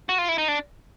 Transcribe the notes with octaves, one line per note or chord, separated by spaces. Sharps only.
F#4
F4
E4
D#4
D4